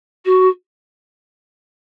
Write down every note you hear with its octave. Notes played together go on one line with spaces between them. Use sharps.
F#4